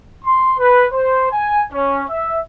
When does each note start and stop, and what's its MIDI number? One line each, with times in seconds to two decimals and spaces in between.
0.25 0.53 84
0.58 0.86 71
0.93 1.27 72
1.32 1.62 80
1.73 2.03 61
2.09 2.38 76